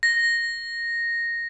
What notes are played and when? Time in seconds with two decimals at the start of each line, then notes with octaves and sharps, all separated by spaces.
0.03 A#6